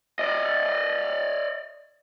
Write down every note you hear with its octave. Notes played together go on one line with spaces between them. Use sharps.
D5 D#5